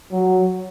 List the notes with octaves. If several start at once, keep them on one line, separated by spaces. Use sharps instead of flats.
F#3